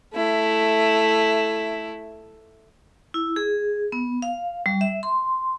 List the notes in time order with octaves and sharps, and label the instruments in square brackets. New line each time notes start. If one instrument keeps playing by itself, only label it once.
[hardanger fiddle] A3 E4
[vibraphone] E4
G#4
B3
F5
G3
E5
C6